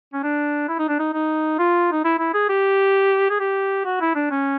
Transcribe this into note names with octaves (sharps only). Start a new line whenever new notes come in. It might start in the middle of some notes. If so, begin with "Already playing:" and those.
C#4
D4
E4
D#4
D4
D#4
D#4
F4
D#4
E4
E4
G#4
G4
G#4
G4
F#4
E4
D4
C#4